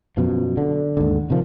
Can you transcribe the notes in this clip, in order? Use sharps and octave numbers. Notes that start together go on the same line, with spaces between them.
F#2 B2 F3
D3
D#2 G#2 D3
C3 D#3 F3